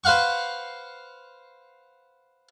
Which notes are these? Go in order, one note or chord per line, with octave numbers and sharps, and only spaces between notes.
B4 C5 F5 F#5 C#6